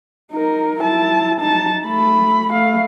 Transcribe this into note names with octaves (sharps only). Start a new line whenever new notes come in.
D#4 A#4
E4 A5
D#4 A5
A3 B5
A3 F5